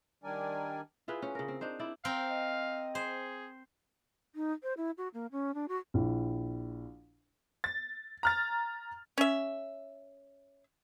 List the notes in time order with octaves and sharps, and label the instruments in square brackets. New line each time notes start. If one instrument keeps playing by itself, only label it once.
[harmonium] D#3 G3 D4 A#4 D5 G#5
[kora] E4 F4 G#4 B4
C#4
C#3 A#4
C4
D4 D#4 C5
E4 D5
[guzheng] C4 A#4 G5 [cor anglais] F5
[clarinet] D#5
[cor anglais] G#4 [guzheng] C5
[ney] D#4
C5
E4
F#4
A#3
C#4
D4
F#4
[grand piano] A#1 E4
[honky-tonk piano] A6
A#5 F6 A6
[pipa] C#4 E5